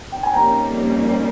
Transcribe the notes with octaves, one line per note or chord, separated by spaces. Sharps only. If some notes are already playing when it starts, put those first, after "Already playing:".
G5
G#5
F2 D#3 G3 A#3 C#4 G5 A#5